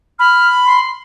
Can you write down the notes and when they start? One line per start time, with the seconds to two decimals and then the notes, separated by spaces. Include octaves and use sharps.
0.19 B5 F6
0.65 C6